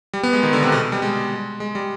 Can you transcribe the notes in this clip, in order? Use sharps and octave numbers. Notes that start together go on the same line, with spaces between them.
G3
B3
G#3
D#3
D3
C3
B2
G3
G#3
G#3
G3